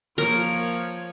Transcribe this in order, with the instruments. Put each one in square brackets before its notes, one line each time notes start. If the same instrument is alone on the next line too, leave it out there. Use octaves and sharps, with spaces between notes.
[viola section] F3 A#3 C#5 [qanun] A#4